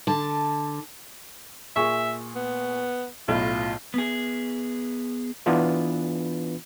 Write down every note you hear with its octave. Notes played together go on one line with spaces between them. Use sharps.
D3 A5
A#2 G#4 E5 C#6
B3
B1 A2 F4
B3 G#4
E3 B3 D4 F4 B4